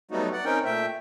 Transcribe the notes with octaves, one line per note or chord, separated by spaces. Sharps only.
F#3 G3 A3 B3 D#4 F#4
D5 F#5
C4 C#4 D#4 A#4 G5
A#2 A3 E5 G5